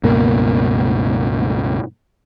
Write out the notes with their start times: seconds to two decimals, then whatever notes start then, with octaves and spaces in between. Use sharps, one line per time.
0.03 C#2 G2 B2 A#3